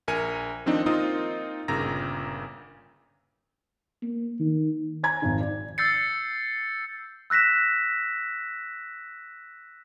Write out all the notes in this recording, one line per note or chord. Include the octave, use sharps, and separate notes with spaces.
A#1 A#4 G#5 C#7
D#3 F3 C4 D4 D#4
A#3 C4 D#4 F4 A#4 D#6
G1 A#2 C#3 A#5 A#6
A#3
D#3
G#5 A#5 G#6
G#1 F2 D#3
D5
E6 G6 A6 C7 C#7
E6 F#6 A#6 B6 E7